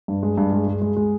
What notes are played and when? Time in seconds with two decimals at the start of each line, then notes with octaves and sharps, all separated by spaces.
0.08 G2
0.23 G#3
0.37 G2
0.52 G#3
0.67 G#3
0.82 G#3
0.97 G#3